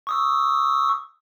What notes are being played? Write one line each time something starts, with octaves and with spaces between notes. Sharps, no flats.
C#6 D#6 E6